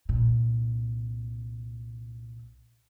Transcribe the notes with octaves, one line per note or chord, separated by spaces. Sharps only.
C2 A#2